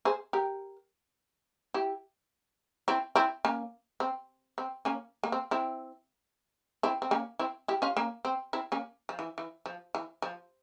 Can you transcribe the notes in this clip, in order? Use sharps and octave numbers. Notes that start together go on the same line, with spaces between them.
G#4 C5
G4 A#4
E4 G4
C4 E4
C4 E4
A#3 C#4
C4
C4
A#3 C#4
A#3
C4
C4 E4
C4 E4
C4
A#3 C#4
C4 E4
E4 G4
C#4 F4
A#3 C#4
C4
C4 E4
A#3 C#4
F3
E3
E3
F3
E3
F3